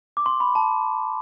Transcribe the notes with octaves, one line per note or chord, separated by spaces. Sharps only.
D6
C6
B5
A5